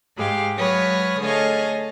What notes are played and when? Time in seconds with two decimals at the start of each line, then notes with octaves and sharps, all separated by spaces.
0.17 G#2 G#3 G4 F5
0.56 F#3 G#3 B4 C#5 D#6 F6
1.20 D3 A3 G#4 C#5 D#5 F5